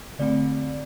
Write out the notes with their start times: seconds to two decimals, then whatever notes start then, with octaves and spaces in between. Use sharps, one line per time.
0.19 D3 A3 C4 D5